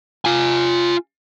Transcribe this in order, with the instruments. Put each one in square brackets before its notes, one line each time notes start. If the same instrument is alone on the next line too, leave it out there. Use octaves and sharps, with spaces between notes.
[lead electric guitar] F4 G#5